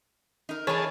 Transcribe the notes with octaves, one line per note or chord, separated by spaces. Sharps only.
D#4 A#4
E3 D#4 G#4 A#4 C#5 A5